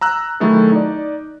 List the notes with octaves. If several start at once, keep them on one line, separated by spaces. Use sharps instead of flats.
A#5 E6 F#6
D#3 F#3 A3 E4 G#4 A4
D#4 D5